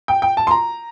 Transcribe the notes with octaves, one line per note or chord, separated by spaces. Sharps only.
G5
G5
A5
C6
A#5